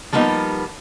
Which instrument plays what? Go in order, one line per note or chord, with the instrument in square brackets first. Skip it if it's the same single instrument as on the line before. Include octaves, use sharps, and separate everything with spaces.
[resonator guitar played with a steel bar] F3 G3 A#3 B3 D#4